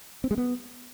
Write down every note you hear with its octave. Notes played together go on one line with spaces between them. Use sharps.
C4
G#3
B3